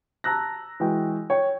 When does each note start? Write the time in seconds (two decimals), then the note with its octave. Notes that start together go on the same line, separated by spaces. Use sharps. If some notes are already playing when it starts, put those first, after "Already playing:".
0.24 A5 A#5 E6 F#6 A#6
0.80 E3 G#3 F#4 G5
1.30 C#5 G5